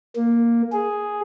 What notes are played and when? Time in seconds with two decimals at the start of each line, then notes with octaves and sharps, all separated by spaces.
0.16 A#3
0.72 G#4